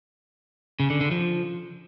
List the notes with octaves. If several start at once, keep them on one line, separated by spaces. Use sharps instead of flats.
C#3
D3
D3
F3